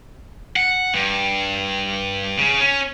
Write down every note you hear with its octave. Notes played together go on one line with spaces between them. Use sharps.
F#5
G2
C#3
C#4